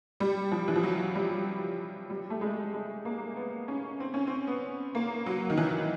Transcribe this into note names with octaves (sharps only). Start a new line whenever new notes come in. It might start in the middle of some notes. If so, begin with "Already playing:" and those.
G3
F3
E3
F3
F#3
G3
G3
A3
G#3
G#3
A#3
B3
C#4
C4
C#4
C4
B3
A#3
F#3
D#3
E3